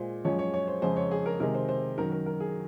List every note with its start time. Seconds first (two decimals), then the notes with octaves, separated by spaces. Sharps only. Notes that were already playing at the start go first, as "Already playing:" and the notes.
Already playing: A#2 G#3 C5
0.24 F#2 F3 G#3 C#5
0.39 C#5
0.54 C#5
0.68 C5
0.82 F2 C#3 G#3 C5
0.97 C#5
1.11 G#4
1.26 A#4
1.40 C3 D#3 G#3 A#4
1.54 C5
1.69 C5
1.98 F#2 D#3 F#3 A#4
2.12 A#4
2.26 A#4
2.40 G#4